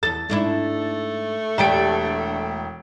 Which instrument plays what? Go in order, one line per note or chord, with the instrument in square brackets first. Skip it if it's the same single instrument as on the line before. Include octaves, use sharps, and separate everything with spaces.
[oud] E2 A4 [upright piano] A6
[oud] G#2 D4 E4 [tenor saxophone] A3
[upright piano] E1 G5 D7 [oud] D4 G4 A4